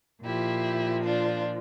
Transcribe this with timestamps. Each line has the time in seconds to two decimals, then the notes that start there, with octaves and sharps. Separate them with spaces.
0.24 A#2 F3 E4 G4
1.04 D4 F4